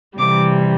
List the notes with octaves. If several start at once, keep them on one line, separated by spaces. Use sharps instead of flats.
C3 E3 G3 D6